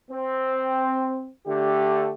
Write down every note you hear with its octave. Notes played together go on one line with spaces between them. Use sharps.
C4
D3 A3 G4